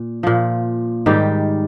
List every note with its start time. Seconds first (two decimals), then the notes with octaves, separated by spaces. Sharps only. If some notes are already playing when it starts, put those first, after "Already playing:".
Already playing: A#2
0.23 A#2 F3
1.06 G#2 D#3 G3 G4